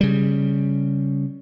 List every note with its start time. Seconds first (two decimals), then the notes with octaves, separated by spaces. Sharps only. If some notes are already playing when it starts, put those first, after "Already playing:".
0.01 C#3 G3